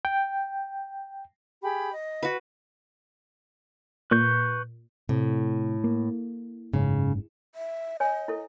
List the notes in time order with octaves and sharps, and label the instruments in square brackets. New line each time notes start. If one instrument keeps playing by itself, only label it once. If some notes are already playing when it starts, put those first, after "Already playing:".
[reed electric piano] G5
[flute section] G4 G#4 B5
D#5
[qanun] F#4 B4
[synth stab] A#2 [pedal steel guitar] B4 C#6 G6
[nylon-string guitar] A2 [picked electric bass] C3
[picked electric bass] A#3
[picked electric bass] F#1 G#2 C#4 [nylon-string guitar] C#3
[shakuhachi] E5
[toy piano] C#5 G#5 [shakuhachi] D#5
[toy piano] E4 A4